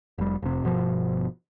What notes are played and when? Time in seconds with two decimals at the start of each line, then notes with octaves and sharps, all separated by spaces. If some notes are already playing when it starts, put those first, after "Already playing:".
0.18 F1 G3
0.42 F1 C3
0.64 G1 B2 F3